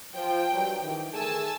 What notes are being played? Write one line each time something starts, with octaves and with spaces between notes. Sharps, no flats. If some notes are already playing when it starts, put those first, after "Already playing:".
F3 C5 G5
G2 F#3
D#3 E3
D#3 A3 G#4 G#5 A5 E6